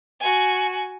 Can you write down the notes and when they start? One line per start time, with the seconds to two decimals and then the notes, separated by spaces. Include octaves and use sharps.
0.20 F#4 G#5